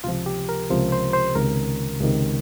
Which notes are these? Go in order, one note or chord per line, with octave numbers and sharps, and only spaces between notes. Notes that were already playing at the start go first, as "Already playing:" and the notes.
C#2 C3 F3 F4
G4
A#4
C#2 C3 F3 C5
C5
C5
C#2 C3 D#3 A#4
C#2 C3 D#3